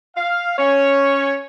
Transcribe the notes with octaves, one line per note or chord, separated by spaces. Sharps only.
F5
C#4 C#5